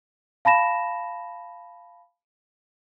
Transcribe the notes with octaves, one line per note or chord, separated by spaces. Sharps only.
F5 A5 B5 A#6 E7